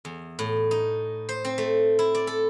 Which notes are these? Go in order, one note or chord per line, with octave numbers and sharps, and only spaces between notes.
E2
A2
D#4
C5
C4
A3
E4
D5
A4